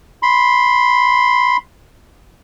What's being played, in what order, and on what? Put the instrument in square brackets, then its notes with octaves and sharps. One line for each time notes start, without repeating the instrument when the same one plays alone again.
[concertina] B5 C6